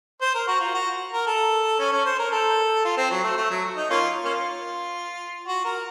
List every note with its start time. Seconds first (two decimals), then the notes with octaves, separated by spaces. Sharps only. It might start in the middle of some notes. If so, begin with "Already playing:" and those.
0.22 C5
0.35 A#4
0.48 F#4
0.61 F4
0.74 F#4
1.13 A#4
1.27 A4
1.79 C#4
1.92 C#4
2.05 C5
2.19 A#4
2.32 A4
2.85 F4
2.97 C4
3.11 F#3
3.24 A3
3.37 A3
3.50 F#3
3.76 D#4
3.90 A#3 C#4 F4
4.25 A#3 C#4 F4
5.48 F#4
5.65 A#4